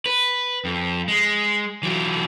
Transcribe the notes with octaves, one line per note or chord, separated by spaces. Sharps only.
B4
F2
G#3
E3 F#3